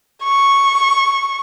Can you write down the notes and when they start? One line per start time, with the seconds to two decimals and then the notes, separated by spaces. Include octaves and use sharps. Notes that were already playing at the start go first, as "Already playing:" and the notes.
0.23 C#6